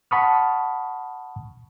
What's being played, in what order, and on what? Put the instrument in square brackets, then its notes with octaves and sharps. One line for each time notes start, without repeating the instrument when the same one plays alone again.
[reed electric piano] F#5 A5 B5 C#6 D#6 F6